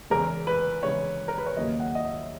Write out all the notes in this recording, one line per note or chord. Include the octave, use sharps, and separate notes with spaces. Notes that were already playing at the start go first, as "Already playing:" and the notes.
E2 C#3 G#3 A#4
B4
E2 C#3 G#3 C#5
A#4
B4
C#5
D#2 C#3 F#3 A#3 D#5
F#5
D#5
E5